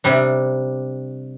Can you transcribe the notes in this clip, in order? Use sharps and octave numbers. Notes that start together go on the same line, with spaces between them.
C3 G3 D4